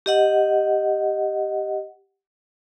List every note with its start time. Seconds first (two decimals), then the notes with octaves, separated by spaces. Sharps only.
0.06 G4 D#5 F#5